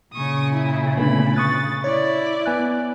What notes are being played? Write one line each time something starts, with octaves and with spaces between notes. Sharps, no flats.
A#2 C#3 C#6 D#6
E4
D3 A3 B3 B5
C#6 D#6 F#6 A6
E4 C#5 D5
B3 G#5 F#6